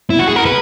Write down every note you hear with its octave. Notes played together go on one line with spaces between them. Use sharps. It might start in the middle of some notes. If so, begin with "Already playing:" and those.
E4
F#4
G#4
A#4
B4